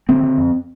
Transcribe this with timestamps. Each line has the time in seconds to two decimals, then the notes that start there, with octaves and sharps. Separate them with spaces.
0.09 D3 C4
0.23 D3
0.38 F2